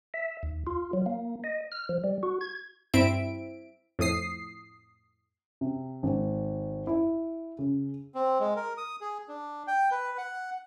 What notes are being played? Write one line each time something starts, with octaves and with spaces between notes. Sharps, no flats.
E5
D#2
F4
F#3
A#3
D#5
F6
F3
G3
F#4
G#6
G2 C4 E4 E5 D7
F2 A2 D#6 C7
C3
G#1
E4
C#3
C4
G#3
A#4
D#6
G#4
D4
G5
B4
F#5